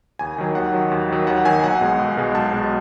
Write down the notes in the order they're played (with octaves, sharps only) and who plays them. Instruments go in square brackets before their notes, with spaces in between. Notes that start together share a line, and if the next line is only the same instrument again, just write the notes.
[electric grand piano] D#2 G#5
D#3 F#3
D#2 F#5
D#3 F#3
D#2
D#3 F#3
D#2 F#5
D#3 F#3 G#5
B1 F#5
B2 G#3
B1
B2 G#3
B1 A5
B2 G#3